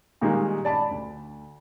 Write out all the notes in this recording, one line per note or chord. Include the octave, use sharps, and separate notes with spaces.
A#2 D#3 G3 G#3 A#3 D#4
D5 A5 B5
D2